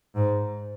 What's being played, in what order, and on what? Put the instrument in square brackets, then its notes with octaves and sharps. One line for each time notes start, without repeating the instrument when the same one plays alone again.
[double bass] G#2